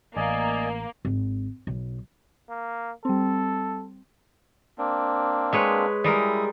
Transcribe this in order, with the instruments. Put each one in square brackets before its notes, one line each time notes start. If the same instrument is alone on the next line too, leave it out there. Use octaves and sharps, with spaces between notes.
[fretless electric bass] A1 [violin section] A#3 [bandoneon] D5 D#5 G#5
[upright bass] G#1
B1
[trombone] A#3
[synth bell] G3 C4 [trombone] A4
[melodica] A#3 C4 D4
[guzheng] G#3 B4 C#5
[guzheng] G3 G#3 A#4 [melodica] E4 D#6